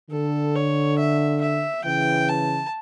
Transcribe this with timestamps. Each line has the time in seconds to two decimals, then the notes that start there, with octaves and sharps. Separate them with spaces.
0.11 D3 A4
0.55 C#5
0.98 E5
1.41 E5
1.84 C#3 E3 G5
2.29 A5